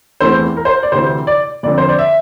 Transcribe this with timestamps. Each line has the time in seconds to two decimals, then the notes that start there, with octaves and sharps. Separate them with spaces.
0.20 E2 E3 A3 C4 C5
0.57 A#4
0.65 C5
0.83 D5
0.92 D2 C3 E3 C5
1.27 D5
1.63 F2 D3 F3 C4 D5
1.78 C5
1.89 D5
1.99 E5